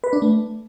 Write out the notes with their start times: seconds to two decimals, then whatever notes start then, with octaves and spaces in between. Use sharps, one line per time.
0.04 B4
0.13 D4
0.22 A3